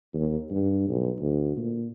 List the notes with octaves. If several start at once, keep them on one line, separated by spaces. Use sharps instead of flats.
D#2
G2
B1
D2
A#2